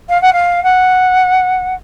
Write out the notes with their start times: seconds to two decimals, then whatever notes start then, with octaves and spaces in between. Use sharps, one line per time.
0.09 F5
0.21 F#5
0.32 F5
0.63 F#5